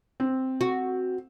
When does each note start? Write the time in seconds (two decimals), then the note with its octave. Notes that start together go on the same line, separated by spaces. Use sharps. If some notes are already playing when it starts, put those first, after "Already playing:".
0.20 C4
0.61 F#4